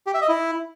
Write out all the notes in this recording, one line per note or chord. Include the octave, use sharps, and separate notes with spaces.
G4
E5
D#5
E4